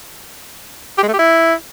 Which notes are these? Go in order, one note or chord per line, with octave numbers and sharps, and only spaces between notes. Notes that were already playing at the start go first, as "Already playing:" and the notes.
G4
G#3
A3
G4
E4